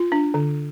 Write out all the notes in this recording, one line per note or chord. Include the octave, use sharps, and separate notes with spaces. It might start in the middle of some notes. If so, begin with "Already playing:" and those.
Already playing: F4
D4
D3